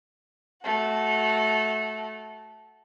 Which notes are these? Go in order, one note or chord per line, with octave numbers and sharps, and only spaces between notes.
A3 F#4